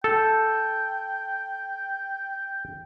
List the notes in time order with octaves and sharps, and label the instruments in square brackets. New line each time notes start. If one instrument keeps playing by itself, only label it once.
[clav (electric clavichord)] A4 [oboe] G5